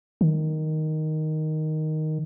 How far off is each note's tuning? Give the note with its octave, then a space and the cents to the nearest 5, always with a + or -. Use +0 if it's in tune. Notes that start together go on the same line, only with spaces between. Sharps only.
D#3 +0